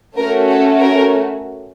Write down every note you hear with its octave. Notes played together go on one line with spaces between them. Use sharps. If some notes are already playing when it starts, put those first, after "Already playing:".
A3 C#4 F#4 A#4
A4
A#4